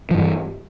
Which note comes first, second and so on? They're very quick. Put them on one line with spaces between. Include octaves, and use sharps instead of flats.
F3 G2 E3